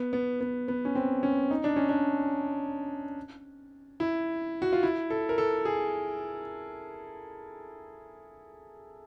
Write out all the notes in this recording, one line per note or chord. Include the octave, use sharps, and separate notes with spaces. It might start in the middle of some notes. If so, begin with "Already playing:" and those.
Already playing: B3
B3
B3
B3
C#4
C4
C#4
D#4
D4
C#4
D4
E4
F#4
F4
E4
A4
A#4
A4
G#4